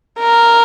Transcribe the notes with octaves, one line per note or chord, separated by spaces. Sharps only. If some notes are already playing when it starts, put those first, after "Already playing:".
A#4